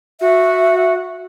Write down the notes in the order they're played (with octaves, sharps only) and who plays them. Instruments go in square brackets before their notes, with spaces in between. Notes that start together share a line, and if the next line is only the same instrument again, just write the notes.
[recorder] F#4 [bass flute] E5